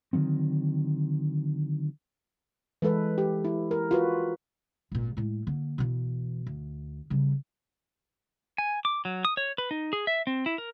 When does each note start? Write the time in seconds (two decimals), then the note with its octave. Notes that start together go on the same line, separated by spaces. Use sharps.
0.13 D3 D#3 F#3 C4
2.82 E3 G#3 A4 B4
3.18 G4
3.45 E4
3.71 A#4
3.91 F4 F#4 B4
4.92 G#1 A#2
5.17 A2 G#3
5.47 D3 A#3
5.78 B2 E3
6.46 D2
7.10 C#3 G3
8.58 G#5
8.85 D6
9.05 F#3
9.25 D#6
9.37 C#5
9.58 B4
9.71 D#4
9.93 G#4
10.07 E5
10.27 C4
10.46 E4
10.58 A#4